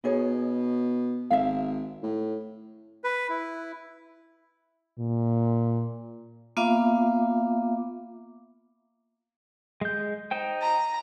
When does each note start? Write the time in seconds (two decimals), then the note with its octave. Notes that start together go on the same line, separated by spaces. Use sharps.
0.04 B2 D#4 G#4 C#5
1.30 G#1 E5 F5
2.03 A2
3.04 B4
3.29 E4
4.99 A#2
6.57 A#3 B3 F4 E5 F5 D6
9.81 G#3 G6
10.31 D#4 C5 G5
10.62 A#5